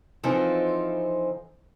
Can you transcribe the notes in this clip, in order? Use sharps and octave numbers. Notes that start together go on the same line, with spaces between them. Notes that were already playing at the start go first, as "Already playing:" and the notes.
E3 F3 C4 D#4 F4 A4